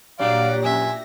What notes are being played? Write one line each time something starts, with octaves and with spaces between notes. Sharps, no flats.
A#2 F#3 G3 D4 G4 D5 F5 A#6
F2 E5 G#5